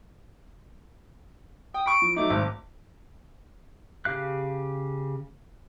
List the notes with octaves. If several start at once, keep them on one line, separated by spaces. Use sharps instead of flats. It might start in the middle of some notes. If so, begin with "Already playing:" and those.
G5 D#6
B5 C#6 D#6 D7
F3
F#3 A3 D#4 D6
G#1
C#3 G4 F5 F#6